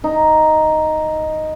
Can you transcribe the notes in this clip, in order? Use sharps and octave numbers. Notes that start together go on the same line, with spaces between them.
D#4